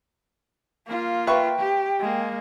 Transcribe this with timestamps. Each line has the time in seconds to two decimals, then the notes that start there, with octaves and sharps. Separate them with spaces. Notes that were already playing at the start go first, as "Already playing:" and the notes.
0.86 A#3 F4
1.27 B4 E5 G5 C#6
1.59 G4
1.99 G#3 A#3